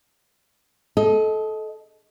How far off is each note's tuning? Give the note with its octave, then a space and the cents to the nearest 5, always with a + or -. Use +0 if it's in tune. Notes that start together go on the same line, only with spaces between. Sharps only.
A4 -20 D#5 +15